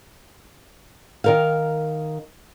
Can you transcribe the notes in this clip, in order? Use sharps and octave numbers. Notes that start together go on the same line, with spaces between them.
D#3 A#4 F5